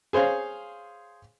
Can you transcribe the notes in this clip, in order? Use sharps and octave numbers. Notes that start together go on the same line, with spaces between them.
G#4 C5 C#5 F5